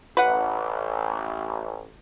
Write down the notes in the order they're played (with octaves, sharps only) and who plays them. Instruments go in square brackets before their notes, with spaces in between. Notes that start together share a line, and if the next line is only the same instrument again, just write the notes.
[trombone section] A1 [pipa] B4 F#5